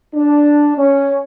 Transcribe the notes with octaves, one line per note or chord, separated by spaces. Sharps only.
D4
C#4